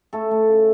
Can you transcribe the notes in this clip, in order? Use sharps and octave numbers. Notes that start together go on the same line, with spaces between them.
A3 A4
A3
C#3